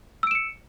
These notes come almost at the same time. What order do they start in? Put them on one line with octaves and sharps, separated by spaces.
E6 D7 E7 C#7